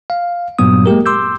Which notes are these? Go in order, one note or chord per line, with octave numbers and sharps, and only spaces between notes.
F5
G2 A#2 F#3 B3 D#6
G#3 A#3 G4 A#4
C6 D6 E6 G6